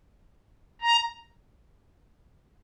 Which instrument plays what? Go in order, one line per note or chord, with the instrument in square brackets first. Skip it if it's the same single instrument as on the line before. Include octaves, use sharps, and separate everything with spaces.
[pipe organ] A#5